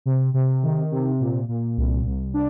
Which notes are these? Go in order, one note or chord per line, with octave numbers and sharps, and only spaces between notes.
C3
C3
D#3
C3
A#2
A#2
C2
C2
D4